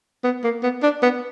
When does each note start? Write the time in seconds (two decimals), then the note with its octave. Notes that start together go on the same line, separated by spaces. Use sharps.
0.24 B3
0.44 A#3
0.63 B3
0.83 D4
1.03 B3